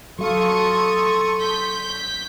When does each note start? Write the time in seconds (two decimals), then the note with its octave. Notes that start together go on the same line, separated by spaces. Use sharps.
0.19 F#3 A4 F5 C6 C#6 D#6
1.40 G6 B6